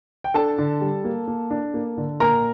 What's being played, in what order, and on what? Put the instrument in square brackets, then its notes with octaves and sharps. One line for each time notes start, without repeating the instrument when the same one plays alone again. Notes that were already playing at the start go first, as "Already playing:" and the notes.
[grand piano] G5
[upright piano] D4 [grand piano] A4 A5
[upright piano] D3
G3
A#3
A#3
D4
A#3
D3
[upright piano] A#2 [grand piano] A#4 A#5